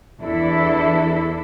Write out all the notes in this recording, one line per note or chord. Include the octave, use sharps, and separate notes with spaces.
E2 E3 D4 E4 A4